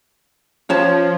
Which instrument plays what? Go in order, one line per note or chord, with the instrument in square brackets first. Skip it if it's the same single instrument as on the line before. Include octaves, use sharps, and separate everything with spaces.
[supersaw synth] F3 [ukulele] C#4 C#5 A5